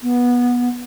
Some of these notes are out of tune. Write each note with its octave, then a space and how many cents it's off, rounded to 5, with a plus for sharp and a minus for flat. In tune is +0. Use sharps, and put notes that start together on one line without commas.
B3 -15